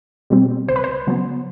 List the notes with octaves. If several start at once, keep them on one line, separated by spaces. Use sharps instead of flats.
B2 G3 C4
C#2 C5
B4
C5
C#3 F#3 B3